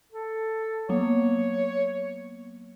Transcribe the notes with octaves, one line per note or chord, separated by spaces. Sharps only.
A4
F#3 A#3 B3 C#5